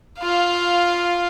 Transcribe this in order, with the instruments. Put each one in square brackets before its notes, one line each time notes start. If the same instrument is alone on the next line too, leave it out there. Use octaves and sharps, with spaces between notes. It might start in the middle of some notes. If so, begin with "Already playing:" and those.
[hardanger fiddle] F4 F5